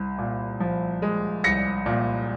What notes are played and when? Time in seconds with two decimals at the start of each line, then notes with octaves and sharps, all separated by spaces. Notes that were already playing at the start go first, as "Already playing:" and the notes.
Already playing: C2
0.18 A#2
0.60 F3
1.02 G#3
1.44 C2 A#6 C#7
1.86 A#2